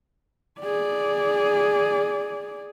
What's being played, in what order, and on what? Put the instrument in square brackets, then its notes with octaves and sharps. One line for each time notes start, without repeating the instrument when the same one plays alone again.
[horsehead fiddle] G#4 D5